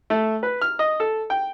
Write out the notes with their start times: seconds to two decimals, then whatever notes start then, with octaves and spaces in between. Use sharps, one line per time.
0.10 A3
0.43 B4
0.62 F6
0.79 D#5
1.00 A4
1.30 G5